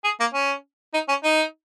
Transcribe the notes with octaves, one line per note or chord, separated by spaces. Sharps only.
G#4
A#3
C#4
D#4
C#4
D#4